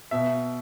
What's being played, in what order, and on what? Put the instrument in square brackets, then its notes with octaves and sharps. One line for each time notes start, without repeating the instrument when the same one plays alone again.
[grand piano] B2 E5